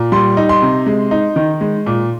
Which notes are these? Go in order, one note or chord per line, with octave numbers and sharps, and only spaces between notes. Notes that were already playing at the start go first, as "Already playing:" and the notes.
Already playing: A#2
G3 C6
D#4
C6
C3
G#3
D#4
D#3
G#3
A#2